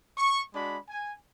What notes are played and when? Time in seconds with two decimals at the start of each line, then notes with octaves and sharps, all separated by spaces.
0.18 C#6
0.53 G#3 D4 F#4 B5
0.89 G#5